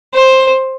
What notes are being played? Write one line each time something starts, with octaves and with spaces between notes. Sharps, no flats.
C5